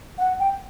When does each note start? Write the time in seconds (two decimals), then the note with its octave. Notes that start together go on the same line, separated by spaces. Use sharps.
0.18 F#5
0.40 G5